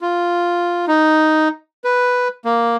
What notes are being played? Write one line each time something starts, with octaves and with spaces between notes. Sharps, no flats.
F4
D#4
B4
A#3